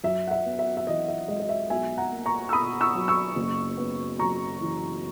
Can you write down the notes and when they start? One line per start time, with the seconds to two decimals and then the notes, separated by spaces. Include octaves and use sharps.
0.04 F#2 E5
0.27 F#5
0.31 E5
0.46 B3
0.59 E5
0.77 E5
0.87 E3 D#5
1.08 E5
1.28 G#3 D#5
1.40 D#5
1.49 E5
1.70 B1 E5 G#5
1.98 F#5 A#5
2.12 A#3
2.26 A#5 C#6
2.49 E6
2.53 B2 B5 D#6
2.81 C#6 E6
2.95 F#3
3.08 C#6 E6
3.36 F#1
3.78 B3
4.19 F#2 A#5 C#6
4.60 E3